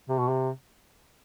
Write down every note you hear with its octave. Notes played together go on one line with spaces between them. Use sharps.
C3
B2
C3